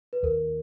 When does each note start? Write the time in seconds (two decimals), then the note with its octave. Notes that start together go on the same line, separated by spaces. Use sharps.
0.13 B4
0.23 D#2 A#4